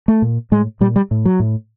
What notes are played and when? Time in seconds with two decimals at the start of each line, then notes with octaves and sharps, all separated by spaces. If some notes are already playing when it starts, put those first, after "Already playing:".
0.08 A3
0.22 A#2
0.52 A2 G#3
0.81 A#2 G3
0.96 G3
1.11 A2
1.25 F#3
1.40 A2